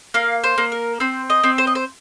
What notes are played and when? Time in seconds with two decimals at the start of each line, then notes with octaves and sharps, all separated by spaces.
0.14 A#3 F5
0.44 C5
0.58 A#3
0.72 A#4
1.00 C4 C5
1.30 D#5
1.43 C4
1.58 C5
1.67 D#5
1.75 C5